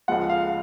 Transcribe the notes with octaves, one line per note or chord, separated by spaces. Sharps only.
C#2 C#3 F3 G#3 F#5
F5